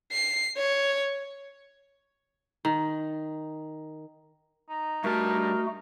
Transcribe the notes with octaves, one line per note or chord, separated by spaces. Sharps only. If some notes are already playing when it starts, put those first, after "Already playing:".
C7
C#5
D#3
D#4
G2 A3 F#4 A#4 A5